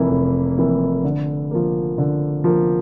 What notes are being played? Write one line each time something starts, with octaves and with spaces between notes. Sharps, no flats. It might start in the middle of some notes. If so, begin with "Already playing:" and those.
Already playing: F1 F2 E3 A#3 E4
F1
F2 E3 A#3 E4
D3
F3 A#3
D3
F3 A#3